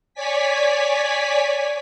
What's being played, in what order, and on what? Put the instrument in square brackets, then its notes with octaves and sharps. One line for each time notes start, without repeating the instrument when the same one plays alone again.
[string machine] C#5 D5 G#5 B6